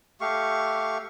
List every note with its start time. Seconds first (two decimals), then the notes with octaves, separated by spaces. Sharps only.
0.21 A3 G4 F5 C#6